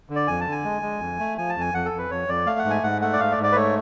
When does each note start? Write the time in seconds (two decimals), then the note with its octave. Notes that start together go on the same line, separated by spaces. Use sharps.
0.10 D3
0.16 D5
0.28 F2 G#5
0.41 A5
0.47 D3
0.52 G#5
0.64 G#3
0.82 G#3
1.01 F2
1.19 A3
1.38 F3 G#5
1.49 A5
1.56 F2 G#5
1.74 F2 F#5
1.86 A4
1.93 F2
1.98 B4
2.10 F2 C#5
2.28 F2 D5
2.46 A3 F5
2.59 F#5
2.65 G#2
2.70 G#5
2.83 G#2 F#5
3.01 A3 F#5
3.13 D5
3.20 G#2 F5
3.32 D5
3.38 G#2
3.43 D5
3.52 B4
3.55 A3 C#5